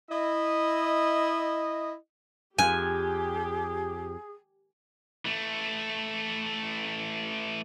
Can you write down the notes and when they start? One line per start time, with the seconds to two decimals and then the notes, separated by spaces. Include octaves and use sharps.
0.11 E4 D#5
2.58 F2 G4 G#4 G#5
5.25 E3 A3